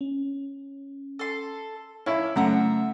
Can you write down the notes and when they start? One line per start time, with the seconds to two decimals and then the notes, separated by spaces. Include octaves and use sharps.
0.01 C#4
1.19 A4 C6
2.06 A#3 C#4 E4
2.36 F#2 C#3 A3 C#4 E5 F#5 A#5